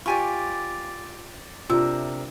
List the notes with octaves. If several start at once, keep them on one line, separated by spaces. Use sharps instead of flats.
F4 G4 D5 G#5 C#6
C3 D4 F4 A#4 E5